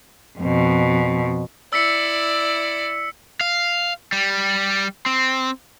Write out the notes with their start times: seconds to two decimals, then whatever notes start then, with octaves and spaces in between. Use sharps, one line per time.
0.38 F2 B2
1.73 E4 D5 E6 B6 C#7
3.41 F5
4.12 G3
5.06 C4